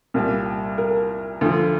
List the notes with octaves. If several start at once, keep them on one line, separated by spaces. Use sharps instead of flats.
C2 A#2 G3
A#4
D2 D3 F3